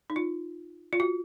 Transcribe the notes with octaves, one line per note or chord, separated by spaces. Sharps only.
D#4
F4
F4
F#4